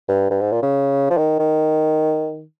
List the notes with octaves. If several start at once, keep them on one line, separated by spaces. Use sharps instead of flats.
G2
G2
G#2
A#2
C#3
F3
D#3
D#3